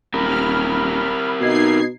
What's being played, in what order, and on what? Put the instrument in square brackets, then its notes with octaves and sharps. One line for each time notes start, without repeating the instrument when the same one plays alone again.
[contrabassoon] D#1 [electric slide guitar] C4 G4 A#4 [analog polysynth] B5 F6
[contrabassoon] B2 [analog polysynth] D#4 G#6 C7